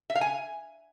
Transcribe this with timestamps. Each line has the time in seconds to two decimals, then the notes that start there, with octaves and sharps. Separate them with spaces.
0.10 E5
0.15 F5
0.21 G#5